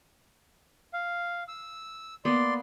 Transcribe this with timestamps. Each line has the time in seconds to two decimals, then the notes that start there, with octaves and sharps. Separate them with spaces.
0.93 F5
1.48 E6
2.25 A#3 B3 D5 C6